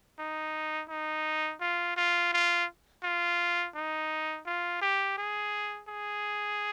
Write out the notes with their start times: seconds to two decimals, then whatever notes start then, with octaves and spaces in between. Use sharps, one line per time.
0.19 D#4
0.90 D#4
1.61 F4
1.97 F4
2.33 F4
3.03 F4
3.76 D#4
4.46 F4
4.81 G4
5.18 G#4
5.89 G#4